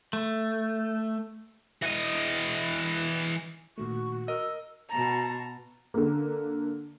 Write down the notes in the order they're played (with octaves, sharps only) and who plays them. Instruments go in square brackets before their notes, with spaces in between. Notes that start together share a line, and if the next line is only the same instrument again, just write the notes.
[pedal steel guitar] A3
[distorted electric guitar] E3 D#5
[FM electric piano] A#2 D#3 A3 [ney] F#4 [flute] C#6
[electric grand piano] A#4 D#5 [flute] E6
[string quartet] B2 F#4 A5 A#5
[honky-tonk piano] D3 A#3